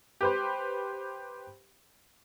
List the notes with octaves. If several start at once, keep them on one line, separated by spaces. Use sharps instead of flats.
G4 B4 C5